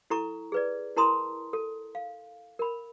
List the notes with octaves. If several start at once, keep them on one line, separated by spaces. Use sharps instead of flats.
E4 A4 A#5 C#6
G#4 B4 D5
E4 A#4 A5 A#5 C6 D#6
A4
F5
A#4 B5